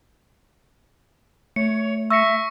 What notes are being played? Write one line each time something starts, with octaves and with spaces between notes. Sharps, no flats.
A3 C#5 C#7
E5 C#6 E6 A#6 C#7